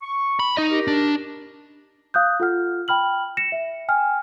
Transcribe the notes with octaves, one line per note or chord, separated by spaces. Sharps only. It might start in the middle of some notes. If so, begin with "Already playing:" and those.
C#6
B5
D#4 D#5
G4 A#4
D4
F5 D#6 F#6 G6
F4 A4 F#5 F6
G5 B5 F6 F#7
A#6 C#7 E7
E5
G5 G#5 F6